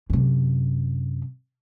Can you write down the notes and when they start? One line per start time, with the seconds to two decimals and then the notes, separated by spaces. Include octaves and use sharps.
0.10 F#2 C3